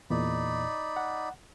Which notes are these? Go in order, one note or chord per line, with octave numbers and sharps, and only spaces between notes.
E2 A#2 D#4 D5 B5
F#5